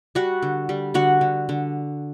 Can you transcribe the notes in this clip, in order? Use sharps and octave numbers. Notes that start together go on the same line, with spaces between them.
G3 F#4 F#5
D3
G3
D3 F#4 F#5
D3
D3